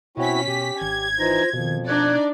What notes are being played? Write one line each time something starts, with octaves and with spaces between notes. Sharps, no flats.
B2 C4 C#4 E4 F#4 B6
B2 G4
G#1 G#6
E3 D#4 F4 C5 A#6
F2 B2 D#3 F3
D4 D#4 D5 F#6 G#6